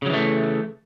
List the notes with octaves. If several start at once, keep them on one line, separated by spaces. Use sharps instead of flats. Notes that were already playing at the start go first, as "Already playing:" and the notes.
C#3 E3 F#3 A3